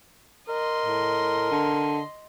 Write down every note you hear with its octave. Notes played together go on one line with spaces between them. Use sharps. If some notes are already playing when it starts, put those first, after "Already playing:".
A#4 D#5 C6
A2
D3